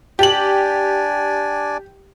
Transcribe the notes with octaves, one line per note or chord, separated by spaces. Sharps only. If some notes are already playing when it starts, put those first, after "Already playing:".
D4 G4 D5 G#5 F#7